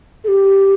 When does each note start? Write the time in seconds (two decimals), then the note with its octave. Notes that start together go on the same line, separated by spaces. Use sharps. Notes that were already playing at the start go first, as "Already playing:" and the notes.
0.24 A4
0.28 G4